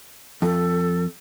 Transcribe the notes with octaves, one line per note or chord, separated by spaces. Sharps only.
F2 A4